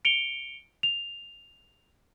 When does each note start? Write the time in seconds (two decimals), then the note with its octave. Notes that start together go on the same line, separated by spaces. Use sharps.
0.05 C#7 D7 F7 G7
0.83 F7